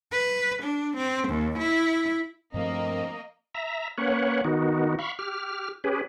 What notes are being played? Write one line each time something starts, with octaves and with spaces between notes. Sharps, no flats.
B4
D4
C4
D#2
E4
G2 F3 A3 A#3 C4 D#5
E5 A#5
A#3 C#4 B4 C#5 F#5
D#3 B3 D#4 F#4
F5 B5 C#6
G4 F6
C#4 G4 G#4 B4